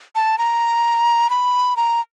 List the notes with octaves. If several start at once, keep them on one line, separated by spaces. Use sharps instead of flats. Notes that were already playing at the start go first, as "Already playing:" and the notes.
A5
A#5
B5
A#5